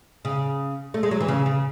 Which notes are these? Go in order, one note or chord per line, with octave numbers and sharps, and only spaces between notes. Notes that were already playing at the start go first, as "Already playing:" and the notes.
C#3
A3
G#3
F#3
E3
C#3
C#3